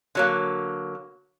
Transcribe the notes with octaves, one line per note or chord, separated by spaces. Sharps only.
D3 F#3 A#3